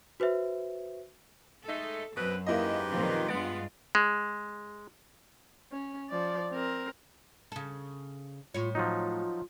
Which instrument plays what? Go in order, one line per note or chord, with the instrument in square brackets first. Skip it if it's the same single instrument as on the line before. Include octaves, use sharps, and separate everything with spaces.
[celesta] F#4 B4 C5 E5
[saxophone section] G#3 A3 D#4 [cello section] A4
[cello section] F#2 [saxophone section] B2 C4 B4
[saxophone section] G#2 G4 B4 [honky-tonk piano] A#3 E4 D#5
[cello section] A#2 D#3 F4 [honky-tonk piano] F3 C4
[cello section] G2 G#3 F4 [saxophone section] B3 [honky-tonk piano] A6 D7
[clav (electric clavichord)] G#3
[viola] C#4
F3 D5
C4 A#4
[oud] C#3 A4
[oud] A2 C#5 [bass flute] F4
[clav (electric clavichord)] F3 F#3 D#4 [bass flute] F4